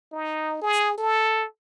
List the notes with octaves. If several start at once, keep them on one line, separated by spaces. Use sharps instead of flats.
D#4
G#4
A4